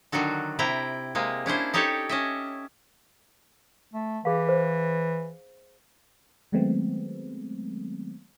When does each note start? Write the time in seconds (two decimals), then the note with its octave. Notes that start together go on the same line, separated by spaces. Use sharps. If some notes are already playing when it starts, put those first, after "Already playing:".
0.12 D3 D#3 F#3 F#4 A4
0.59 C3 E4 G5 A#5
1.15 C3 G#3 A#3
1.46 C#4 D4 E4 C5
1.74 D#4 G4 A4 C#5
2.09 C#4 D#5 E5
3.94 A3
4.25 E3 G#4 F5
4.49 C5
6.52 D#3 F#3 G#3 A3 B3 C4